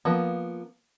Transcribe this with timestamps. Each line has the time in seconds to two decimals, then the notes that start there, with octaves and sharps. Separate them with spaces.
0.05 F3 A#3 B3